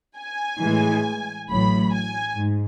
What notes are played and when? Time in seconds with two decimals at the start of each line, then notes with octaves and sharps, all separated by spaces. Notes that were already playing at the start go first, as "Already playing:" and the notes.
0.17 G#5
0.62 A2 E3 G#3
1.49 A1 A2 F#3 B5
1.94 G#5
2.38 G#2